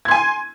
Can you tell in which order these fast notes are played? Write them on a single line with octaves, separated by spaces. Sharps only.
G#6 C6 G#5